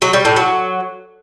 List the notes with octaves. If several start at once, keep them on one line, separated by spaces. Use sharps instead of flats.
F#3
G3
A2
F#3